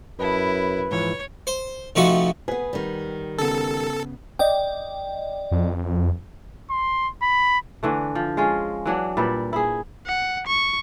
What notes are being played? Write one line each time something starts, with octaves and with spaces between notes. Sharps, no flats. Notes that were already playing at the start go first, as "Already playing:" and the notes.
F#2 E4 B4 D#5 G5 A5
G#2 E3 F3 C#5
C5
C3 F3 A3 D#4 F#4 C#6
B3 G#4 B4
D#3 G3
C#3 B3 A4
D5 D#5 G5
F2
C6
B5
D3 E3 A3
F3
G#3 C#4 F4
E3 F#3 D4 F#5
A#2 G3 E4 B4
E4 G#4
F#5
C#6